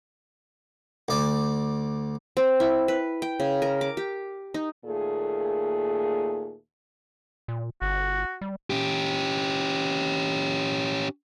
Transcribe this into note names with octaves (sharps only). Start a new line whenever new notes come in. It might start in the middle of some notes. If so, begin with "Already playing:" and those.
D2 D5
C4
E4
B4
G5
C#3
A#4
D6
G4
D#4
D#2 A#2 A3 G#4
A#2
G1 F#4
G3
C#4 G4